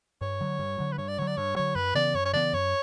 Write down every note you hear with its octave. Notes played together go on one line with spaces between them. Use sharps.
G2 C#5
D3 F#3
G2
D3 F#3
B4
G2 C#5
D5
D3 F#3 C#5
D5
G2 C#5
D3 F#3 C#5
F#2 B4
C#3 E3 B3 D5
F#2 C#5
C#5
C#3 E3 B3 D5
F#2 C#5